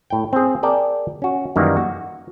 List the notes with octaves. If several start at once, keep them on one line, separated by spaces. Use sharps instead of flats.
A2 G5
C4 G#4
G#4 A#4 D5 G5 A5
C#4 F#4
F#2 D#3 E3 G3 A#3
F#4